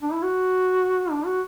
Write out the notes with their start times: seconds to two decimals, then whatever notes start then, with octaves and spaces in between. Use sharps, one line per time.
0.03 D4
0.13 E4
0.23 F#4
1.11 D4
1.26 F#4